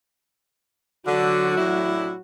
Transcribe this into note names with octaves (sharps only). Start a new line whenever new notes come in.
D3 F#3 F#4
A2 D4 E4